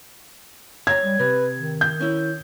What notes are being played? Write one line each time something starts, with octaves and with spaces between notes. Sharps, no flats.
C#5 A#5 G#6
G3
C3 B4
D#3
G6
C#4 E4